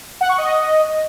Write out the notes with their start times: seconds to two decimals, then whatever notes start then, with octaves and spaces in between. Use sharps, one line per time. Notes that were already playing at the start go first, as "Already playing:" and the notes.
0.21 F#5
0.29 C#6
0.38 D#5